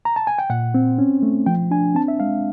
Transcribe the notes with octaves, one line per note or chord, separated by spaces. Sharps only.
A#5
A5
G#5
G5
A#2 F#5
C4
C#4
A3
F3 G5
D4 G#5
C4 A5
E5
G#3 F5